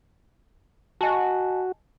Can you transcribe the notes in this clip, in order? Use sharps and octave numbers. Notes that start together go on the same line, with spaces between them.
F#4 D#5 G#5 A5